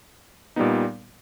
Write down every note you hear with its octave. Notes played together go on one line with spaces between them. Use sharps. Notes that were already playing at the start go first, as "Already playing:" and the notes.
A#2 G3 B3 D#4